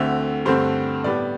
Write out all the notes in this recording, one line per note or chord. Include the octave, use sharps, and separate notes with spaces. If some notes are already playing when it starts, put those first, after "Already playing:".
Already playing: D2 D3 A3 C4 E5
G2 D3 A3 C4 C5
A2 G3 B3 D5